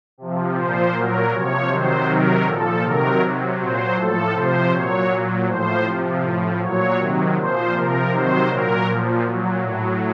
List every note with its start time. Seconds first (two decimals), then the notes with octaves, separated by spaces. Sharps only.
0.18 C3 F3
0.55 A#2 F3 C5
0.93 A#2 F#3 A#4
1.31 C3 F3 C#5
1.68 C3 D#3 F#3 C5
2.06 C3 D#3 F#3 A#4
2.44 A#2 F3 A4
2.82 C3 D#3 F#3 A#4
3.20 C3 F#3
3.57 A#2 F#3 C5
3.95 A2 F3 A4
4.33 C3 F3 C5
4.70 A#2 F#3 C#5
5.09 A#2 F#3
5.46 A2 F3 C5
5.84 C3 F3
6.22 A2 F3
6.59 A#2 F#3 C#5
6.97 C3 D#3 F#3
7.35 A#2 F3 C5
7.73 C3 F3 A#4
8.10 C3 D#3 F#3 C5
8.48 A#2 F#3 A#4
8.86 A#2 F3
9.24 A#2 F#3
9.62 A2 F#3